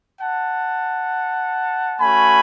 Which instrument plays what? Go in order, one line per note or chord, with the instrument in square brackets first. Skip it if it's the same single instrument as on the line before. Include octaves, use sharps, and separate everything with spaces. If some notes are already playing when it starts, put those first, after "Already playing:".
[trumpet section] F#5 A5
A3 C#4 F#4 G#5 B5